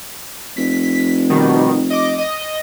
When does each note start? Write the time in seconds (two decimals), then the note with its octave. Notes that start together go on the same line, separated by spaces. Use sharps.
0.57 F1 B6
1.30 B2 D#3 G3
1.90 D#5 D6
2.18 D#5